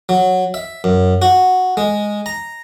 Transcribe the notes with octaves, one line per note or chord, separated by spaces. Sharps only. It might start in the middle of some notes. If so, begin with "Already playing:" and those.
F#3
E5
F#2
F#4
G#3
A#5